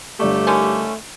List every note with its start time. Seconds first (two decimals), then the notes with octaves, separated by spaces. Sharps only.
0.20 G1 A3 G4 D5 C#6
0.47 D3 D#3 C#4